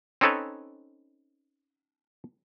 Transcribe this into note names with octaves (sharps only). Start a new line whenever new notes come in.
C4 C#4 D#4 A4 B4 C#5